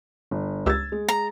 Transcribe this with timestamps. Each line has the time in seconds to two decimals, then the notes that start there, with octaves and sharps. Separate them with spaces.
0.31 G1
0.66 C#2 G4 E6 G#6 A6
0.92 G#3
1.08 A#5